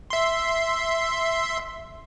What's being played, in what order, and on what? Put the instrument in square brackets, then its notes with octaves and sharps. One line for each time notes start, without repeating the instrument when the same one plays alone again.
[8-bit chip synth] E5 C6